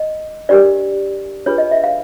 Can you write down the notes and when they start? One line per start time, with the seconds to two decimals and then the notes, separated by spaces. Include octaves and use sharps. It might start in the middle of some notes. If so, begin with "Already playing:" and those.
Already playing: D#5
0.49 D4 G4 A#4 D5
1.46 D4 F4 G#4 B4 C#5
1.58 D#5
1.71 E5
1.84 F5